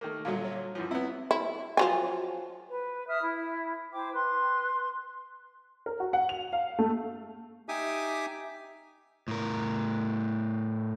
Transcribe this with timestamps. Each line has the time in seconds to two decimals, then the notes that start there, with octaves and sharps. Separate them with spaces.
0.01 D#3 A3 A#3
0.25 A#2 D3 F#3 G3 F#4 F5
0.45 C#5
0.75 F#2 E3 F3
0.91 B3 C4 E4
1.31 E4
1.77 F3 F#3 G#5
2.68 B4
3.07 E5 D#6 F6
3.21 E4
3.92 E4 C5 G5 D6
4.13 B4 C6
5.86 A#4
6.00 F#4
6.13 F#5
6.29 F7
6.53 F5
6.79 A3
7.69 D#4 G4 E5 G#5 D6 D#6
9.28 A2 A#4